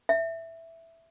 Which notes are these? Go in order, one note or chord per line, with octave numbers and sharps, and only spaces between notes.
E5